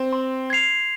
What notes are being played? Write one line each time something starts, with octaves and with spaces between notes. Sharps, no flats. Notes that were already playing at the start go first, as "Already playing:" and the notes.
Already playing: C4
C6
G#6 C7 F7